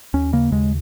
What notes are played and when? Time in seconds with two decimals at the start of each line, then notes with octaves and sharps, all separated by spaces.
0.14 D#2 C#4
0.33 C#3 A#3
0.52 D#2 G#3